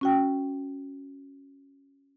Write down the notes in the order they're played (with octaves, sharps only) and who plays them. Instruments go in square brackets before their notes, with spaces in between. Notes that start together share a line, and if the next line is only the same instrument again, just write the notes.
[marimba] C#4 F#4 G5